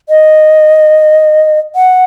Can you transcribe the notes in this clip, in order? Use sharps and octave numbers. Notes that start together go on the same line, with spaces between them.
D#5
F#5